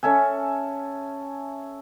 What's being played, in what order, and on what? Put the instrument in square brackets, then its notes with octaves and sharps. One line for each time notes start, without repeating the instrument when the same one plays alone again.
[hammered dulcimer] C#4 A4 E5 G#5